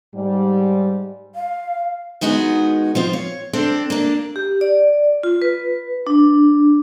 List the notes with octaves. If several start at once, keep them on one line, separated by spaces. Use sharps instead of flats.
G#2 G3
F5
D#3 G#3 B3 D#4 F#4
F3 C4 F4
C#5
C4 D4 A4 C5
A#3 D4
G4
D5
F4
B4
D4